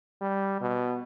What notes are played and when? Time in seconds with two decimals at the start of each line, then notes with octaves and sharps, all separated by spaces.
0.21 G3
0.61 B2